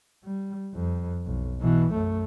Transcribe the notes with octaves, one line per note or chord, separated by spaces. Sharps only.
G3
F2
B1
B2 E3
F#2 A3